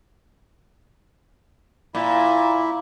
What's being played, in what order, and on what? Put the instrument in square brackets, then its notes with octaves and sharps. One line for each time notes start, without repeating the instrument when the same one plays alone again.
[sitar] A#2 [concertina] E4